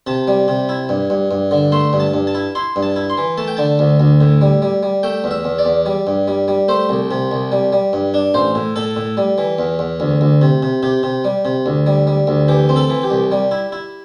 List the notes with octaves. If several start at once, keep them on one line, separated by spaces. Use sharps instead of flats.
C3 A5
G3
C3
E4
G2
G2
G2
D3
A3 C6
G2
A5
G2
A5
E4
E4 C6
G2
A5
E4
C6
E3
A3 A5
G5
D3 A5
D2
D2
A2
G3
G3
G3
A3 G5
E2
E5
E2
D5
E2
G3
G2
G3
G3
A3 C5
C2
C3
C2
G3
G3
G2
D4
A1 C5
A2
A2 A4
A2
G3
E3
E2
E2
D2
D2
C3
C3
C3 G4
C3
G3
C3
D2
G3
G3
D2
E3 G4
C4
A4
E3
G4
C2
G3
E4
E4